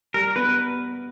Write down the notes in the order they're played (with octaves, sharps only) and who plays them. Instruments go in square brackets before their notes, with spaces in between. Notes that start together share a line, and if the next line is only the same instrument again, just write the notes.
[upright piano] G3 [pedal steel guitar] A#4
[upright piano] B3 [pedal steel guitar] B4